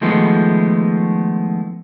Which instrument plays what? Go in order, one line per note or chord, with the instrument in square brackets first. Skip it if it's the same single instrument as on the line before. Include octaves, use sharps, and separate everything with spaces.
[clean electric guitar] D#3 F3 G#3 A3 B3